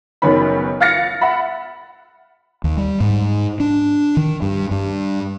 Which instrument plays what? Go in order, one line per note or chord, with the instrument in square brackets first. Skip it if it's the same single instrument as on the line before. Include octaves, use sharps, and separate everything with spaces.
[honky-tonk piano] F#1 D#3 B3 C#4 B5
F5 F6 A6 A#6 C#7
E5 F#5 B5
[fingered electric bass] D#2
G3
G#2
D4
D#3
G2
G2